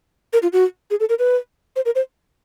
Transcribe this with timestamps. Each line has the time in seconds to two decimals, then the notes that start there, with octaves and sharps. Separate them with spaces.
0.33 A#4
0.43 F4
0.53 F#4
0.91 G#4
1.00 A4
1.09 A#4
1.19 B4
1.76 C5
1.86 A#4
1.95 C5